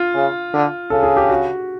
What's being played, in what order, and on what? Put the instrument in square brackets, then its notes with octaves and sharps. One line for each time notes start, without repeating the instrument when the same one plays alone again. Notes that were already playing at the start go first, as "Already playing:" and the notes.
Already playing: [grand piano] F4
[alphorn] C#3
D3
[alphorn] C#3 [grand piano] A4
[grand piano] G#4
G4
F#4